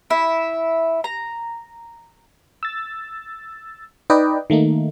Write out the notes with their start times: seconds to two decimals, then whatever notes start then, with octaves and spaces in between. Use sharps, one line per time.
0.10 E4 E5
1.04 A#5
2.63 E6 A6
4.10 D#4 B4 D5 D#5 G5
4.50 D#3 A3 A#3 D#4